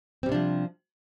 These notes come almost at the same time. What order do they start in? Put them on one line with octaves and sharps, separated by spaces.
C4 G3 C3 D4 F3